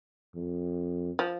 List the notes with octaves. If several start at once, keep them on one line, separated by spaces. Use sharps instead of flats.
F2
F3